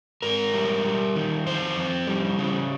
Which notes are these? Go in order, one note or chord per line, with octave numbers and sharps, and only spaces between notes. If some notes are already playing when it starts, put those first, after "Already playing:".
G#2 A#4
G3
G3
D#3
F2 C5
F2
G3
C#3